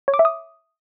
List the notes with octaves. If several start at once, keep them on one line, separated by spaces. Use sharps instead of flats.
C#5
D6
E5
D#6